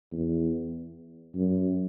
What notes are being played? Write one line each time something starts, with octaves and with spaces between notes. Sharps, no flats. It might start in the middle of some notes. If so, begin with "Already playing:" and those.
E2
F#2